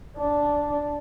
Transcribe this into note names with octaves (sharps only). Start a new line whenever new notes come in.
D4